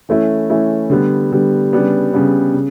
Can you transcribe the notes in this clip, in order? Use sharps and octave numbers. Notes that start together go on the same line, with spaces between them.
E3 A3 C#4 E4
E3 A3 C#4 E4
D3 G3 B3
D3 G3 B3
C#3 G3 B3 D4
C#3 G3 B3 D4
C#3